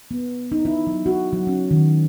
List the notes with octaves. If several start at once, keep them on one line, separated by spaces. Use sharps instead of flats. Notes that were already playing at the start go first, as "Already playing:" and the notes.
B3
D#4
E4
F#3
F#4
F#3
C#4
D#3